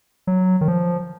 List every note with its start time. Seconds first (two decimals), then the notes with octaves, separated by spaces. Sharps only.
0.27 F#3
0.61 D#3
0.68 F3